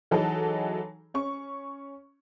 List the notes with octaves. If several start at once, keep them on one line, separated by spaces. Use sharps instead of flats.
E3 F#3 D#4 G#4 A4
C#4 C#6